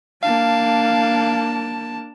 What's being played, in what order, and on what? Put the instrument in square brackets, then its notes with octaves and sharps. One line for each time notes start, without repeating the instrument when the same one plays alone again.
[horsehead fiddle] A#3 D4 [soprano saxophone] F5 [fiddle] A5